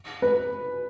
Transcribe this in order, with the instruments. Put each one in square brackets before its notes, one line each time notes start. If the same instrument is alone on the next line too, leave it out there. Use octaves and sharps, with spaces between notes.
[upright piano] B4